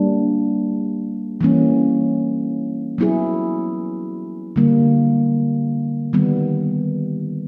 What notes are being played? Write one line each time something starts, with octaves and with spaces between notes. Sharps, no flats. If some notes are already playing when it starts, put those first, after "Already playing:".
Already playing: G3 A#3 D4
E3 G3 A#3 C#4
F#3 B3 E4 G#4
D3 G3 A#3
D#3 G3 B3